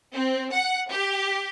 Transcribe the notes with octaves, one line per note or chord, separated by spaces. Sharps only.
C4
F#5
G4